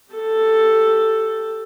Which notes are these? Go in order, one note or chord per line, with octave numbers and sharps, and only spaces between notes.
G4 A4